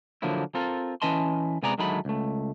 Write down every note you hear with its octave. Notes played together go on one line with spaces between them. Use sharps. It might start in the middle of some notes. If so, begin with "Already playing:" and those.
D3 F3 F#3 A#3 E4
C4 F4 A4 A#4
E3 C#4 B4 D#5 A5 C6
C3 G#3 B3 G#4 D5 A#5
D2 D#3 F#3 G#3 A3 B5
C#2 A3